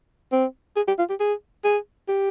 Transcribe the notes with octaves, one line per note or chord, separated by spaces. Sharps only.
C4
G#4
G4
F4
G4
G#4
G#4
G4